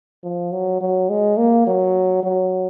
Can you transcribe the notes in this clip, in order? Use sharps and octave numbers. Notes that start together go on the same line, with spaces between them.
F3
F#3
F#3
G#3
A#3
F#3
F#3